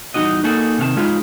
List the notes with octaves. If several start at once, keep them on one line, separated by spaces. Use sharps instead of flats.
E2 G3 D#4 F#4 D#5
A#3 D#4 F#4 G#4 A4
C3 D#3 F5 A5
G#3 D#4 F4 G#4 B4